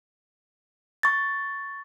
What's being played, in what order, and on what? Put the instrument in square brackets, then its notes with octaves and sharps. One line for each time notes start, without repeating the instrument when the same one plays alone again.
[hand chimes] C#6 A6